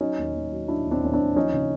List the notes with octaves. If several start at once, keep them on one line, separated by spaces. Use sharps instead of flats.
F#3 C#4 D#4
D#2
D#2
F#3
F#3 D4 E4
D#2
C4 D4
D#2 C#4
C4 D4
D#2
F3 C#4 D#4
C#3